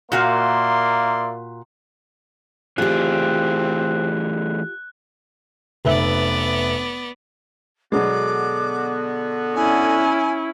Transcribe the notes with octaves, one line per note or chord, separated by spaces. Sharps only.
A#2 A#3 F#4 D5 E5 F5 C6
E3 A3 C4 F4 G4 G#4 F#6
F1 B3 B4 D5 E5
B2 D3 F#3 G#3 B3 F#4 D6
C#4 E4 G#5